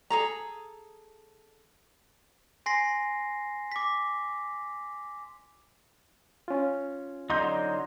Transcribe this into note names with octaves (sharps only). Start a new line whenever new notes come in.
G#4 A4 A#5
G#5 C6 A#6 C7
D6 B6
C#4 F4
D3 F#3 D#4 D#5 C6 G6